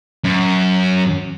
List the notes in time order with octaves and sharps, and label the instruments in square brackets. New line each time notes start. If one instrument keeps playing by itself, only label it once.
[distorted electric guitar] F#2